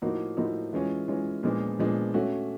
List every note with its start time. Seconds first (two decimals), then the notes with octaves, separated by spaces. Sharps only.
0.02 A2 F3 A#3 D#4 F#4
0.37 A2 F3 A#3 D#4 F#4
0.73 E3 G#3 C#4 F4
1.08 E3 G#3 C#4 F4
1.43 A#2 F3 G#3 B3 D4
1.79 A#2 F3 G#3 B3 D4
2.14 A3 C#4 F#4